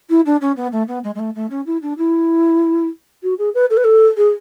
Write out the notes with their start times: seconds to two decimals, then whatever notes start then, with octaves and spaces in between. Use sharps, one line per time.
0.09 E4
0.25 D4
0.41 C#4
0.56 B3
0.72 A3
0.88 B3
1.04 G#3
1.15 G#3
1.19 A3
1.35 A3
1.50 C#4
1.66 E4
1.82 D4
1.98 E4
3.23 F#4
3.38 G#4
3.54 B4
3.70 A4
3.77 B4
3.84 A4
4.17 G#4